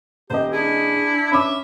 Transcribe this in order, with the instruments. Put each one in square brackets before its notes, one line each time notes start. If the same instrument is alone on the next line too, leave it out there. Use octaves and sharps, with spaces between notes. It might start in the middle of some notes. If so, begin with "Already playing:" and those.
[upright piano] D#1 D#5 [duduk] G4 [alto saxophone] C5
[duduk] D4 [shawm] E4 [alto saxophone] G#4
[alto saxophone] C#4 [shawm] E5 [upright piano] B5 D6